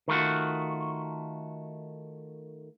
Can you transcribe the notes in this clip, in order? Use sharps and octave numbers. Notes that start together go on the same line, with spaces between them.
D#3 A3 F4 F#4